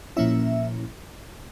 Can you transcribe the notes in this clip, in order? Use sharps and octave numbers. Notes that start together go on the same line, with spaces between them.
A#2 F3 A#3 C#4 E4 E5